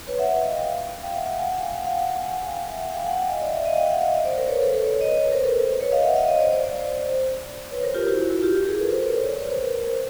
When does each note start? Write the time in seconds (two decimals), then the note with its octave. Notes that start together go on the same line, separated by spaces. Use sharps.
0.07 B4 C#5
0.19 E5 F#5
0.43 D#5 F5
0.55 F5 G5
1.02 F5 G5
1.15 E5 F#5
1.26 F5 G5
1.38 F#5 G#5
1.50 F5 G5
1.62 F5 G5
1.74 F#5 G#5
1.86 F5 G5
1.98 F#5 G#5
2.22 F#5 G#5
2.46 F5 G5
2.69 E5 F#5
2.93 F5 G5
3.06 F#5 G#5
3.17 F5 G5
3.30 D#5 F5
3.42 D5 E5
3.53 D5 E5
3.65 D#5 F5
3.77 F5 G5
3.89 E5 F#5
4.01 D#5 F5
4.13 D5 E5
4.25 C5 D5
4.37 A#4 C5
4.48 B4 C#5
4.60 A4 B4
4.73 A4 B4
4.85 B4 C#5
5.01 C#5 D#5
5.16 B4 C#5
5.32 A#4 C5
5.44 A4 B4
5.80 B4 C#5
5.92 D#5 F5
6.04 E5 F#5
6.16 D#5 F5
6.28 C#5 D#5
6.40 C5 D5
6.52 C5 D5
6.64 C5 D5
6.75 C5 D5
7.71 B4 C#5
7.83 A#4 C5
7.94 F4 G4
8.07 E4 F#4
8.18 E4 F#4
8.31 E4 F#4
8.43 F4 G4
8.66 G#4 A#4
8.78 A4 B4
8.90 A#4 C5
9.02 A4 B4
9.14 B4 C#5
9.26 C5 D5
9.38 B4 C#5
9.50 A#4 C5